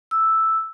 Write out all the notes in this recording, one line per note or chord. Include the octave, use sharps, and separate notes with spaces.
E6